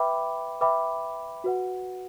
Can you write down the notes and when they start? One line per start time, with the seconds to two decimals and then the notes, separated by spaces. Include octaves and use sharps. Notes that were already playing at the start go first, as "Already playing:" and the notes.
Already playing: B4 E5 G5 B5 D6
0.61 B4 E5 G5 B5 D6
1.44 F#4 B4 F#5